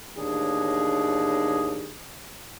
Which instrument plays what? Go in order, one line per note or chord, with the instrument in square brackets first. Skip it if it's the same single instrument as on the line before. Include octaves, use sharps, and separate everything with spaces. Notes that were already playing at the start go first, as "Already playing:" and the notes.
[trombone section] A1 D#2 D4 D#4 G#4